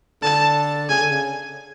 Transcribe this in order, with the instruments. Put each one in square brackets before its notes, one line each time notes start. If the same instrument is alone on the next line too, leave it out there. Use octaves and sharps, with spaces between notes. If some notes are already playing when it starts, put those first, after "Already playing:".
[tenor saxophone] D3 [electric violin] A5
[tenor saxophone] C#3 [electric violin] G#5
[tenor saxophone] D3
C#3